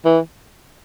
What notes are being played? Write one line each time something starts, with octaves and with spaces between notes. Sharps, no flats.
E3